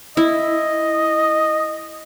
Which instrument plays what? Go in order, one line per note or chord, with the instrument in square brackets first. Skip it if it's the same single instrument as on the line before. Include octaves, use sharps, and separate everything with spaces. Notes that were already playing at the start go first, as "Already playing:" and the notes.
[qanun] E4 [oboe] D#5